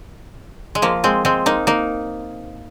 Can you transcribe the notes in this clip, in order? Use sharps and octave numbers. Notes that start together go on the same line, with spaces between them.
G#3
F3 A#3
G#3 C4
G#3 C4
A#3 D#4
A#3 D#4